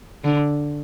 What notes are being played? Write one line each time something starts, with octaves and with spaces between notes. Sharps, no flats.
D3